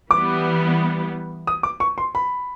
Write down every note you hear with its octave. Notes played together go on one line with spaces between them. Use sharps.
E3 G3 B3 D6
D#6
D6
C#6
C6
B5